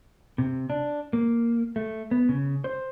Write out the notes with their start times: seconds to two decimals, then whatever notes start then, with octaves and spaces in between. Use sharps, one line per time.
0.38 C3
0.70 D4
1.13 A#3
1.76 A3
2.11 B3
2.29 C#3
2.64 C5